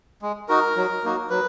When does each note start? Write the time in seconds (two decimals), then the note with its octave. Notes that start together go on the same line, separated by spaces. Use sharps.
0.22 G#3
0.49 D#4 F#4 A#4
0.77 F#3
1.04 A#3 D#4 F#4
1.30 F#3 B4